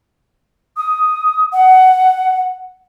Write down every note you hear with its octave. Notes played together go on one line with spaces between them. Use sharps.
D#6
F#5